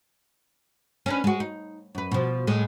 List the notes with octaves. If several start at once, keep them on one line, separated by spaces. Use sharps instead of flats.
C#4 D4 B4
G#3 F#4
D#4
F#2 B4
B2 F3
A2 G#3